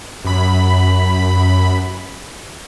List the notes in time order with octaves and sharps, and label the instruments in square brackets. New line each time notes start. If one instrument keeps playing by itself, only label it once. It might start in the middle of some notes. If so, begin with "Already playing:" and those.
[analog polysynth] F#2 B5